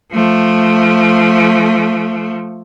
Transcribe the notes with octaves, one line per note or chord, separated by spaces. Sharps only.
F3 A3